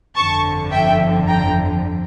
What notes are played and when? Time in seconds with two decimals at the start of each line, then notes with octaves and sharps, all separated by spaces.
0.16 G1 F2 D3 F3 A5 C#6
0.71 E5 G5
1.27 G5 A#5